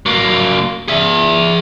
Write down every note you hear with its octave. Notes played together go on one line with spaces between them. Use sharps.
F#3 A#3
G#4 E5